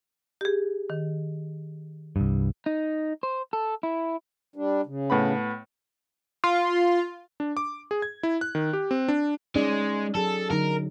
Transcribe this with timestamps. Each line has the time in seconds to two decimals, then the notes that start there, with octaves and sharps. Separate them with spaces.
0.41 G4 G#4
0.90 D#3
2.16 C2 G2
2.66 D#4
3.23 C5
3.53 A4
3.83 E4
4.56 G3 D4
4.86 C#3
5.10 A2 B3 B5
6.44 F4
7.40 D4
7.57 D6
7.91 G#4
8.02 G#6
8.23 E4
8.41 F#6
8.55 D#3
8.73 G4
8.91 C4
9.08 D4
9.55 G#3 C#4 D#4 D5
10.15 F#3 G#4 A4
10.50 D3 F#3 D#4 A#4